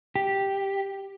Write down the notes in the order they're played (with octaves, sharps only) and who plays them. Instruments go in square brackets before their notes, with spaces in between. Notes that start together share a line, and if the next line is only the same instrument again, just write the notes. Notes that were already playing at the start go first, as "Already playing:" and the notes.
[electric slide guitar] G4